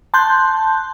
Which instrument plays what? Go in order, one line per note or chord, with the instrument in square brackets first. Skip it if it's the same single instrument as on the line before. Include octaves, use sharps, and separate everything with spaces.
[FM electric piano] A5 C6 F#6 G6